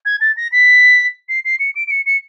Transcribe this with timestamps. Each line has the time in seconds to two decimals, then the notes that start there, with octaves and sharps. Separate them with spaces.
0.05 G#6
0.21 A6
0.37 A#6
0.52 B6
1.29 C7
1.45 C7
1.59 C#7
1.76 D7
1.87 D7
1.91 C#7
2.06 C#7